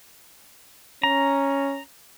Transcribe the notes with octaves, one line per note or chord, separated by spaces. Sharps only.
C#4 A#5